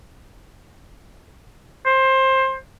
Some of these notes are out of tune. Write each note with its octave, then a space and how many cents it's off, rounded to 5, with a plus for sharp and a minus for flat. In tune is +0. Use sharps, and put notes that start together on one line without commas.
C5 +20